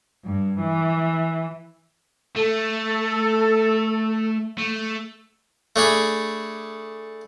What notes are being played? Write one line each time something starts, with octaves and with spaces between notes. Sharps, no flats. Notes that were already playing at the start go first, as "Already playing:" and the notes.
G2
E3
A3 A4
A3
A3 D4 G#4 B5